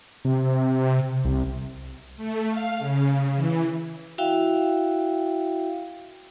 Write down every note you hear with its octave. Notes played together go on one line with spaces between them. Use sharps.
C3
C2
A3
F5
C#3
E3
E4 F#4 E5 F5 G5